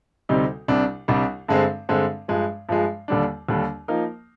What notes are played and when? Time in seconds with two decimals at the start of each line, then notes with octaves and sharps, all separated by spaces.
0.29 D2 C3 G3 C4 D#4
0.68 C2 C3 G3 D4
1.08 C2 C3 G3 D4
1.48 G2 D3 G#3 C4
1.89 G2 D3 G#3 C4
2.28 G2 F3 G#3
2.69 G2 F3 G#3
3.08 D#2 D3 G3 D4
3.49 D#2 D3 G3 D4
3.88 F3 A#3 D#4 A#4